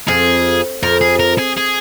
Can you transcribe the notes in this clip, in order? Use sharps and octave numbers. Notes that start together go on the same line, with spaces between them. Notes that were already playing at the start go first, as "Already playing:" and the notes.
F2 G#4
F2 A#4
G#4
A#4
G#4
G#4